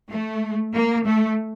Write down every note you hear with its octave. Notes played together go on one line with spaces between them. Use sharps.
A3
A#3
A3